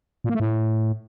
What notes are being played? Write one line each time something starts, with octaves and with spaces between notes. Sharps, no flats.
A#2
A#3
A3
A2